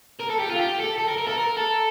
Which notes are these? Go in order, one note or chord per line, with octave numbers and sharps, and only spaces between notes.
A#4
A4
G4
F4
G4
A4
A4
A#4
A#4
A4
A#4
A4